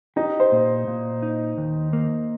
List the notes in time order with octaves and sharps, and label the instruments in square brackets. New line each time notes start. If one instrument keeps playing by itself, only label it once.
[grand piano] D#4 [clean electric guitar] G4
[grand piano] C5
[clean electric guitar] A#2
A#2
D#4
D#2
A#3